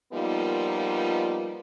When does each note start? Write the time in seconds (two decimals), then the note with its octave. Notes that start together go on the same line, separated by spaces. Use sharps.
0.13 F3 G3 A#3 B3 D#4 F4